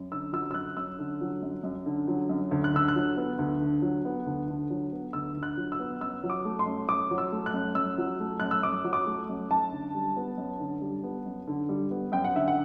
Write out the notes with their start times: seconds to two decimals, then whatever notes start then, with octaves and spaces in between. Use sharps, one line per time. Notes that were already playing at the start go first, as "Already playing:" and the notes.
Already playing: F#2
0.12 D3 E6
0.33 F#3 E6
0.51 E6
0.54 F#2 F#6
0.77 F#2 E6
0.99 D3
1.21 F#3
1.43 F#2
1.64 F#2
1.86 D3
2.08 F#3
2.29 F#2
2.51 D2
2.64 F#6
2.74 D3 E6
2.88 F#6
2.96 F#3
3.17 B3
3.39 D2
3.61 D3
3.82 F#3
4.05 B3
4.26 D2
4.48 D3
4.70 F#3
4.92 B3
5.13 D2 E6
5.36 D3
5.43 F#6
5.57 F#3
5.72 E6
5.80 B3
6.01 F#2 E6
6.23 F#3
6.30 D6
6.45 A3
6.59 C6
6.66 F#2
6.88 F#2 D6
7.11 F#3
7.18 E6
7.32 A3
7.46 F#6
7.54 F#2
7.75 F#2 E6
7.98 F#3
8.20 A3
8.40 F#2 F#6
8.51 E6
8.63 F#2 D6
8.84 F#3
8.93 D6
9.06 A3
9.29 F#2
9.50 F#2 A5
9.72 D3
9.94 G3
10.17 B3
10.38 F#2
10.60 D3
10.81 G3
11.03 B3
11.26 F#2
11.48 D3
11.69 G3
11.91 B3
12.12 F#2 G5
12.24 F#5
12.35 D3 E5
12.48 F#5